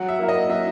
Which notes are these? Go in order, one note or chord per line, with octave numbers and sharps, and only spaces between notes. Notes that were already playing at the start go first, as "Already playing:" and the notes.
Already playing: F#3 F#5
E5
A#3 E4 A#4
D#5
F#3 E5